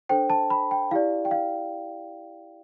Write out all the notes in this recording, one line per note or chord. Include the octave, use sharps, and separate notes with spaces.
D4 A4 C5 G5
A5
B5
G5
E4 G4 D5 F5
G5
F5